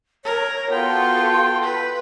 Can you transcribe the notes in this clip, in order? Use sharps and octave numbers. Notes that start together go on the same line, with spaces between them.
A#4 C#5
B3 F4 F#4 A4 G5 C6
B4